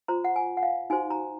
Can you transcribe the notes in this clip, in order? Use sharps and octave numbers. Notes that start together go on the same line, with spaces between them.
F4 C5 A#5
F#5
G#5
F#5
F5
D#4 F#4 C5 G#5
A#5